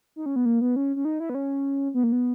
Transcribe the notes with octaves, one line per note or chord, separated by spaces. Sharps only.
D#4
C#4
B3
A#3
B3
C#4
C#4
D#4
E4
B3
C#4
B3
A#3
B3